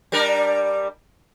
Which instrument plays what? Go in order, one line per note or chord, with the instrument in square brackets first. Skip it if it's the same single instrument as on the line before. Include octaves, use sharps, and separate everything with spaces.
[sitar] G3 D4 A#4